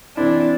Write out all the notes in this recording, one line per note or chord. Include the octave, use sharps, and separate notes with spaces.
E3 C4 D4 E4